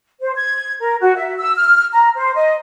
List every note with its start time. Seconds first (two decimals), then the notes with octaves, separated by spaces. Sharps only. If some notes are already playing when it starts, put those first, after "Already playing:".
0.21 C5
0.36 G#6
0.80 A#4
1.01 F#4
1.16 E5
1.38 E6
1.55 F6
1.93 A#5
2.17 C5
2.35 D#5